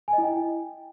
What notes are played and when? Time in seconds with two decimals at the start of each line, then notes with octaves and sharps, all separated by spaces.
0.08 G#5
0.13 D#5
0.18 E4
0.23 G5